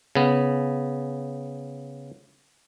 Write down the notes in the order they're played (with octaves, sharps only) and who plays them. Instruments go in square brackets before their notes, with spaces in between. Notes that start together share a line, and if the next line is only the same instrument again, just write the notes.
[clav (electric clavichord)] C#3 B3